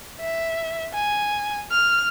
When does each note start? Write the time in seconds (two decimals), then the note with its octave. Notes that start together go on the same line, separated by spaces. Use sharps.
0.20 E5
0.94 G#5
1.71 F6